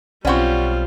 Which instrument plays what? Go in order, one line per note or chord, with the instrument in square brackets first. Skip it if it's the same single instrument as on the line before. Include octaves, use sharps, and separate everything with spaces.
[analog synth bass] B1 [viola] G3 F4 [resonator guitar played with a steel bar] C4 C#4 [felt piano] D5 F#5 C#6